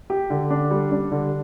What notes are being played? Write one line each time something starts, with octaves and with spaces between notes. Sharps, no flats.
G4
D3
D4
G3
D4
D3